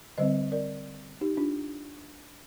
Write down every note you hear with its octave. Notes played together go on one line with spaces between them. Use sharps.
D3 G3 C4 C5 D#5
A#4 D5
D#4 G4
D4 F4